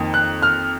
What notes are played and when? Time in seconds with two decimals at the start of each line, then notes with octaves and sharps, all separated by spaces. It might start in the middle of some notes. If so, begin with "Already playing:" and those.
Already playing: F2 D#3 A#3
0.14 F#6
0.42 F6